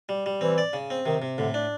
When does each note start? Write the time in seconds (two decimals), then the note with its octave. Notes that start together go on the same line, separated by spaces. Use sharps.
0.09 G3
0.26 G3
0.41 E3 C4
0.58 D5
0.73 C#3
0.90 C4
1.06 C3 D#3
1.22 C3
1.38 A2 D3
1.54 D4